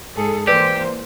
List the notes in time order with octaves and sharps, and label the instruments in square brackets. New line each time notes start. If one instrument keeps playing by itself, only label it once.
[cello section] G#2 G#4 A4
[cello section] E3 A#3 C5 [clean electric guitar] G4 [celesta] B4 D5